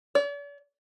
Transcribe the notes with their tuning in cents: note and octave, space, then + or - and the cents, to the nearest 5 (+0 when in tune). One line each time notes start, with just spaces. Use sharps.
D5 -45